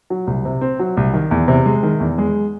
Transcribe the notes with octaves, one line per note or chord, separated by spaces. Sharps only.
F#3
C2
C3
C4
F#3
C2
D#3
E2
C3
G#3
D#3
E2
G#3